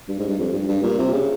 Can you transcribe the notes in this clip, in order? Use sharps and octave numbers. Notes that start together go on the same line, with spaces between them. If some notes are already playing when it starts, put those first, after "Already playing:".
G2
G#2
G2
F2
G2
G2
A#2
C3
C#3